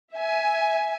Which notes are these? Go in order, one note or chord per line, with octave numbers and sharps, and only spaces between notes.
E5 G#5